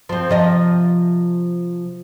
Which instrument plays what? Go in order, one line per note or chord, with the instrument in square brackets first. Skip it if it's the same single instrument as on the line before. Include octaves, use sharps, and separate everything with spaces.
[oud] F3 C4
C3 F3 D#5